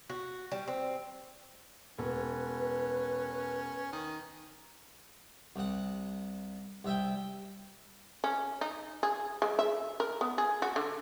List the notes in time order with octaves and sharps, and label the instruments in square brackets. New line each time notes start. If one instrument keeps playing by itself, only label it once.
[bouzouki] F#4
G3
C4
[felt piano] E1 [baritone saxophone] C#4 [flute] B4
[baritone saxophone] D#3
[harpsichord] C2 F#5
C2 E5 G5
[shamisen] C#4
D#4
G#4
G#3
E5
A#4
B3
G#4
F#4
D3